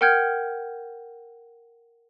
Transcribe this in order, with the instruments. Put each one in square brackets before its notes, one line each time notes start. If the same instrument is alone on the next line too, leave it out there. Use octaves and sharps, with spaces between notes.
[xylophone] A#4 F#5 G5 F6 G6 G#6